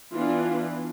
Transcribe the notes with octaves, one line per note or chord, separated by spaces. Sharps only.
E3 B3 D4 F4